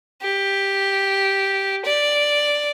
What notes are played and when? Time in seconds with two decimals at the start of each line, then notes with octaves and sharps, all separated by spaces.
0.22 G4
1.85 D5